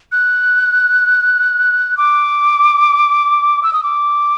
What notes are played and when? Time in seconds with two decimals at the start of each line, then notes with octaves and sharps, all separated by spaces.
0.12 F#6
1.97 D6
3.63 E6
3.73 D#6
3.83 D6